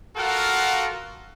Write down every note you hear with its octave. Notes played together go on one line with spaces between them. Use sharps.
F4 F#4 A4 A#4 F5 F#5